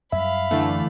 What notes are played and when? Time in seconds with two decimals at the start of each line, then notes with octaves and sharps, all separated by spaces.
0.12 F#2 G3 E5 F5 B5
0.51 D3 E3 A3